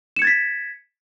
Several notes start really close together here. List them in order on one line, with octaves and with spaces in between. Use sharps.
E7 C#7 G#6 A6 B6